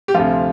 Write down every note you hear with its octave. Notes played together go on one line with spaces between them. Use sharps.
G4
D2 C3 F3 F4